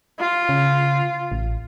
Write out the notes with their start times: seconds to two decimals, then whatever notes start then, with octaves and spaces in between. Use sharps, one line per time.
0.19 F4
0.49 C#3
1.32 A1